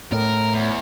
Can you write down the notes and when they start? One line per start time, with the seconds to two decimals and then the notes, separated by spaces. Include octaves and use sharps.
0.12 A2 A#4
0.53 E2